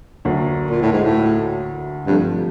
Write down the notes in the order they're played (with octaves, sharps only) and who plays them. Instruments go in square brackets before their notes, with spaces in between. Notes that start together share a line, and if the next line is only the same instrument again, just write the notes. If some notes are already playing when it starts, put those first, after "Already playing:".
[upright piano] D2 D3 F#3 A#3
[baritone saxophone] A#2
A2
G#2
A2
[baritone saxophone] G2 [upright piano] C3 F3 A3